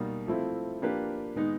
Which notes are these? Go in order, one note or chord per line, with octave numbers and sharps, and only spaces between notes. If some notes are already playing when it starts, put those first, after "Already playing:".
Already playing: B2 G3 A#3 D#4
F3 A3 C4 E4
F3 A#3 D4 G4 B4
D#3 G#3 B3 D#4